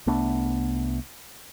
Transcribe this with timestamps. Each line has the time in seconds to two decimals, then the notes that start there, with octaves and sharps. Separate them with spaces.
0.07 C2 A3 B3 D4